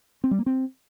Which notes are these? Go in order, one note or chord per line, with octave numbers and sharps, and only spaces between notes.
C4
G3
A#3
C4